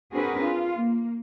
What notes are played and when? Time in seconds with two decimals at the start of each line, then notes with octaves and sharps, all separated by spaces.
0.15 C4 D4 F#4 G#4 A#4 B4
0.46 F4
0.76 A#3